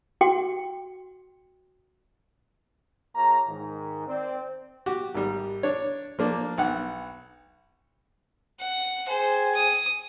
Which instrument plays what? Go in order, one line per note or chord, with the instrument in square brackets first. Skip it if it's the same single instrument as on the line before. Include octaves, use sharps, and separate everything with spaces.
[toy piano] F#4 G5 C6
[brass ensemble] A#3 F4 G#4 C#5 A5 A#5
G#2 D#3
C4 C5 D5
[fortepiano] F#4 G4
G#1 G3
D4 C#5
F3 A#3 D4
B1 F#5
[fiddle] F#5
[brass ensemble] G#4 G5 G#5 [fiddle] C5
[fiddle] D#6